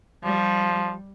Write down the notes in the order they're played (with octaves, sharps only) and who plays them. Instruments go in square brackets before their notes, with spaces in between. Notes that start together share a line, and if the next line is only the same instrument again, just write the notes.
[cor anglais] F3 [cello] G3